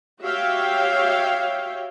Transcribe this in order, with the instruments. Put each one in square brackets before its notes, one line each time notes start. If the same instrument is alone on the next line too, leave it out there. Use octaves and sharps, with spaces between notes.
[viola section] F#4 G4 C#5 E5 F5 G5